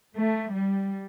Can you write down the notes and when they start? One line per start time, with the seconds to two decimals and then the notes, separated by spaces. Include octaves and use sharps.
0.14 A3
0.51 G3